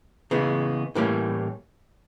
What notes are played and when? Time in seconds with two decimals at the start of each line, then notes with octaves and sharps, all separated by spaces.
0.31 C#3 E3 G#3 B3
0.95 A2 E3 G3 A#3 C#4